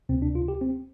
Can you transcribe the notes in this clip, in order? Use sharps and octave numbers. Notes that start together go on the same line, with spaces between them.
D2 C3 C4
D4
F4
G4
C4